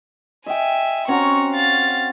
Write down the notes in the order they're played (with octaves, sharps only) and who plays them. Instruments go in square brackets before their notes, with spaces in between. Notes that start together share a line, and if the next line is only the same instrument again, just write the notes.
[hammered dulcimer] D#5 G5 [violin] E5 G#5
[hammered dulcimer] C4 C#4 F#4 [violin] A#5 C#6
[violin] F5 A6